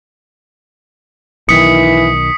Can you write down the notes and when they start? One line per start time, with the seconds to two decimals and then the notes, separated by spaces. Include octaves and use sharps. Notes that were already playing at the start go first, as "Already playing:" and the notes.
1.49 B1 D#3 E3 D#6 B6 C#7